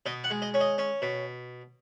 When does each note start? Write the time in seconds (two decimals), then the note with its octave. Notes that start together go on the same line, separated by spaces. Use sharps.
0.06 B2 D#5
0.24 F#5
0.30 G#3
0.42 D#5
0.54 C#4
0.61 D#5
0.78 C#4
1.02 B2